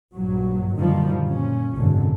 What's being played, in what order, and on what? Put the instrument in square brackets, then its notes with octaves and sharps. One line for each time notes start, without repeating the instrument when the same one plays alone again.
[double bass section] A#1 G2 F#3
F#2 A#2 D3 D#3 F3 G3
A#2 C#4
G#1 F#2 B2 D3